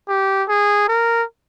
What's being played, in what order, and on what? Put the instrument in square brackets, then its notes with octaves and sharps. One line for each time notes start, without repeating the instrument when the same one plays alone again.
[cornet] G4
G#4
A#4